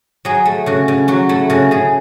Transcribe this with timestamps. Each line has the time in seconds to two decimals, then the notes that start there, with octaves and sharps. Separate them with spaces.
0.25 F#3 G#4
0.46 A3
0.66 C#3 F#4
0.88 C#3
1.08 F#3 F#4
1.29 A3 E4
1.50 C#3 F#4
1.71 C#3 G#4